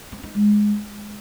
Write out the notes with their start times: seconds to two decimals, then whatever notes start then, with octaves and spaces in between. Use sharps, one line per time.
0.12 C4
0.23 D#4
0.35 G#3